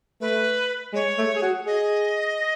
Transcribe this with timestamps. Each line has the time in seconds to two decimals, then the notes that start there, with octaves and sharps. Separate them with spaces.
0.21 A3 B4
0.93 G#3 C#5
1.18 A3
1.36 G#4
1.42 F#4
1.67 G#4 D#5